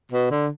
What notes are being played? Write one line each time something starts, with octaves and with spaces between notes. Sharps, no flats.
B2
D3